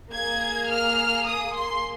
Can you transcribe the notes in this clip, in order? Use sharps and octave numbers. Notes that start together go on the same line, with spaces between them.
A#3 G#4 G#6
F6
D#6
C6